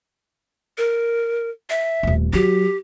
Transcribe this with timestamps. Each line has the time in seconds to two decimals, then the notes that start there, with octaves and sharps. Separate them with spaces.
0.78 A#4
1.70 E5
2.03 D#1 A3
2.33 F#3 G4